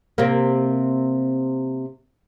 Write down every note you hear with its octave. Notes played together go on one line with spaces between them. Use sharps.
C3 A#3